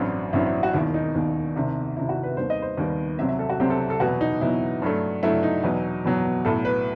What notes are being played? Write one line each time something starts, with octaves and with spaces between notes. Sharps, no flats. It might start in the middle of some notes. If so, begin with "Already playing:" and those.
Already playing: A1 G2 F#3 C4
A1 G2 F#3 C4 E4
E4
F#4
E1 D#2 D#3 E4
D#4
E1 D#2 D#3
C2 C3 D#3
C2 C3 D#3 E4
F#4
B4
D#2 D#3 G3 B3 C5
D#5
C5
D#2 D#3 G3 B3
C2 C3 F#3 C4 E5
E5
A4
F#4
C2 C3 F#3 C4 G4
A4
A4
E2 B2 F#3 F#4
D#4
E2 B2 F#3 E4
G2 F#3 A3
G2 F#3 A3 E4
D#4
E2 B2 F#3
E2 B2 F#3
B1 A2 F#3 A4
B4